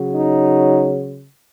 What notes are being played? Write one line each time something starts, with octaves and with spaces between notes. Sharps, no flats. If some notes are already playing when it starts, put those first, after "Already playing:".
Already playing: C#3 F#3
D#4